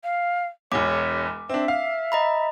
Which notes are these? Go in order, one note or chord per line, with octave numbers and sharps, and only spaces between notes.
F5
E1 E2 C#5 D6
C4 D4 E5
F5
D#5 A#5 B5